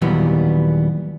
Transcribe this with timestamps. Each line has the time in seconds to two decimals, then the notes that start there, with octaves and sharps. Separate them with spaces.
0.02 D#2 A#2 E3 F#3 G3 B3